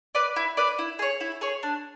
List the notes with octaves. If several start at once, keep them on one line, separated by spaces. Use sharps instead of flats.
B4 D5
E4
B4 D5
E4
G#4 C#5
E4
G#4 C#5
D4